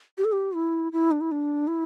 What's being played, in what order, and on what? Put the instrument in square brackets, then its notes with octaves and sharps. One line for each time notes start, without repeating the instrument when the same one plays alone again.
[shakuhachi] G4
A4
G4
E4
E4
D4
E4
D4
E4